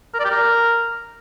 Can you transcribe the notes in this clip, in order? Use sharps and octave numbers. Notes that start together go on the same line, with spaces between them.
A#4
D5
G4
A#4